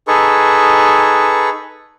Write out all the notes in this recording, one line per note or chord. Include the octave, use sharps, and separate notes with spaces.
D#4 G#4 A4 B4 C#6